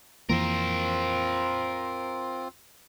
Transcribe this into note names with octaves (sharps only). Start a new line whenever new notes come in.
F2 E3 A#3 C4 F4 A#4 C5